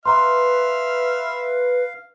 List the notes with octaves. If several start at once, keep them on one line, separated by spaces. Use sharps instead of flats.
B4 E5 F5 A#5 C6 F6